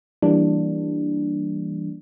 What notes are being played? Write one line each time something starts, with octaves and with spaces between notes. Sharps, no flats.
E3 G3 A#3 D4